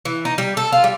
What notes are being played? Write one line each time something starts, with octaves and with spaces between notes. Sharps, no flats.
E3
D#4
G3
A4
F4
G3